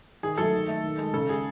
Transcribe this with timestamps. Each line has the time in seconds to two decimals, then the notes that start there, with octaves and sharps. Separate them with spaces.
0.23 D#3 G#4
0.38 F#3 A3 A4
0.53 D#3
0.68 A3
0.84 D#3
0.98 G#3
1.13 C#3 A4
1.29 G#3 G#4